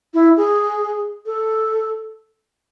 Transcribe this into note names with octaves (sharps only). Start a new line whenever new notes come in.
E4
G#4
A4